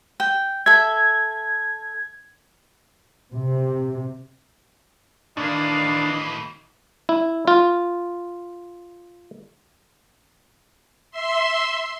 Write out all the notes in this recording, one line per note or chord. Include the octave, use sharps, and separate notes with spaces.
G5
A4 E5 G#6
C3
A2 D#3 E3 D4 D#5 F5
E4
F4
E5 C6